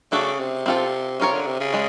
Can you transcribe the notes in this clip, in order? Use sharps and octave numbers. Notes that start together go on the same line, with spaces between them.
C#3 A3 D4 F#4 A4
C3
C3 C4 F4 A4
C3 C#4 F4 A#4 C#5
D3
C3
C#3
G#3